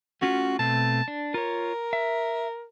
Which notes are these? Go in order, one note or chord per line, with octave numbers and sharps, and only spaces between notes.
A3 C#4 F4 F#4
B2 A3 C4 A5
D4
F4 A#4 C#5
E5